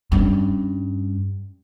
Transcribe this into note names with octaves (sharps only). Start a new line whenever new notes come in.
G2 C#4